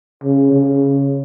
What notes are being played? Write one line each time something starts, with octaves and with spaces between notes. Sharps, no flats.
C#3
C#3